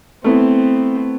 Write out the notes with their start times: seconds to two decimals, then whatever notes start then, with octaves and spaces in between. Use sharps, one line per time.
0.24 A3 B3 C4 E4